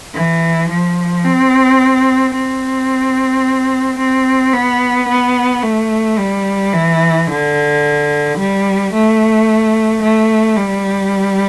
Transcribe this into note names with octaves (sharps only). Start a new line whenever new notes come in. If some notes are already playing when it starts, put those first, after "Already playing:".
E3
F3
C4
C4
C4
B3
B3
A3
G3
E3
D3
G3
A3
A3
G3